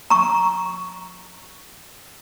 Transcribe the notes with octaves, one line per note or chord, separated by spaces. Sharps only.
A#5 C#6